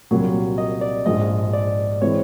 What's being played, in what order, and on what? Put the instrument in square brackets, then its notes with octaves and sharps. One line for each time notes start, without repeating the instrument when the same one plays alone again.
[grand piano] C2 A#2 F#3
[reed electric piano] D#5
D5
[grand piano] A#1 G#2 F3 [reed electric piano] D#5
[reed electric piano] D5
[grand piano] E3 G#3 C4 [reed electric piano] C#5